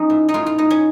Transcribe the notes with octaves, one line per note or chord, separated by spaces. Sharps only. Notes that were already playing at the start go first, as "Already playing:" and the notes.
Already playing: F3 C#4 D#4
A2
D#4
A2 F4
F4
A2 D#4
C#4